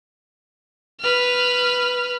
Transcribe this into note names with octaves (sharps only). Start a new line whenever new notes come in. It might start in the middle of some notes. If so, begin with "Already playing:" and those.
B4 F6